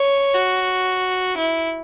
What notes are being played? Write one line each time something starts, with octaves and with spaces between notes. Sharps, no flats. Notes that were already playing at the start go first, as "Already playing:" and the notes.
Already playing: C#5
F#4
E4